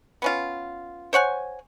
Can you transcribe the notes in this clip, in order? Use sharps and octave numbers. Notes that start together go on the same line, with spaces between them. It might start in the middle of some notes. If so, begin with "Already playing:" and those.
B3 C#4 F4
C5 C#5 F#5 G#5